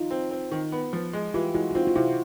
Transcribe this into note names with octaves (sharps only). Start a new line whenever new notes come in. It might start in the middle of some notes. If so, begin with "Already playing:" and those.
Already playing: D#4 F4
C4
C4
D#3
B3
F3
G#3
E3 F4 G4
G#3 E4 F#4
F#4
C4 D#4 F4
F4
C3 E4 F#4